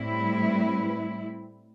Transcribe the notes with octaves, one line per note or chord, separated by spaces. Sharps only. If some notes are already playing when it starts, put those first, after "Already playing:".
Already playing: A2 G3 C4 E4
B4